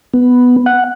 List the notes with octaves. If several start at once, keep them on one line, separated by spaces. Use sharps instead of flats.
B3
F#5